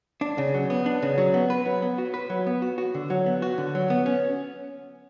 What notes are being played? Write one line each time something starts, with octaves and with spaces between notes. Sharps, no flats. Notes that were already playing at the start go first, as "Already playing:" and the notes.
D4
C#3
F#3
B3
D4
C#3
F#3
B3
B4
F#3
B3
F#4
B4
F#3
B3
F#4
F#4
D3
F#3
B3
F#4
D3
F#3
B3
C#4